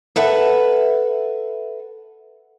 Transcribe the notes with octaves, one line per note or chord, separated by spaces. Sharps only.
A4 B4 E5 F#5